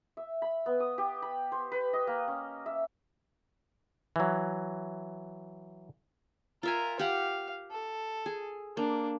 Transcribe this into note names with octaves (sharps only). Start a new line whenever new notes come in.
E5
B5
B3
D#6
G4
B5
C5
B4
D#5
A#3
C#4
E5
E3 F#3
F4 A#4 E5 G#5
G4 F5 F#5
A4
G#4
A#3 D4